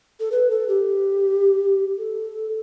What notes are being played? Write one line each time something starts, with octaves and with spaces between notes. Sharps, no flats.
A4
B4
A4
G4
A4